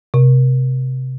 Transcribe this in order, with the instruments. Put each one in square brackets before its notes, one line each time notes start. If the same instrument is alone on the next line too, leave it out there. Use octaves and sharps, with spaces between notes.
[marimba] C3